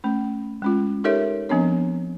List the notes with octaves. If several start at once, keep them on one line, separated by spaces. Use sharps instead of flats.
A3 C#4
G#3 C#4 F4
D#4 G4 A4 A#4 C#5 E5
F3 B3 C4 D4 C#5